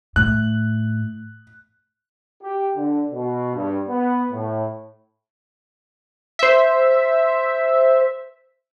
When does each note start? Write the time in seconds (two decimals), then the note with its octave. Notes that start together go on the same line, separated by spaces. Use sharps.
0.16 A2 F#6
2.43 G4
2.76 D3
3.12 B2
3.55 G2
3.88 B3
4.31 A2
6.39 C5 E5